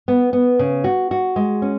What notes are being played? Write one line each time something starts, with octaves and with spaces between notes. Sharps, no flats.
B3
B3
C#3
F#4
F#4
G#3
C#4